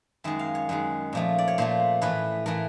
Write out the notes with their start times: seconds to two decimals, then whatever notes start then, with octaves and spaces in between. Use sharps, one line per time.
0.24 F#2 D#3 G#3 E5
0.39 F5
0.55 C#5
0.69 F#2 D#3 G#3
1.13 A#2 F3 A3
1.38 D5
1.48 C#5
1.58 A#2 F3 A3 C5
2.01 A2 E3 A3 B4
2.46 A2 E3 A3 A#4